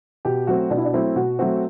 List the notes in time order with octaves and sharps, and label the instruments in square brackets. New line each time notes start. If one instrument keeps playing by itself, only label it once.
[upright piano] B2 [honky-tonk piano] G4
[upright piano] F#3 A3 C4 [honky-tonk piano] F#4
[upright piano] B2 [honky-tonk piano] D4
[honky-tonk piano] E4
D4
[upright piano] F#3 A3 C4 [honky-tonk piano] E4
[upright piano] B2 [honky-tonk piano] F#4
[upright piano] F#3 A3 C4 [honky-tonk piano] F#4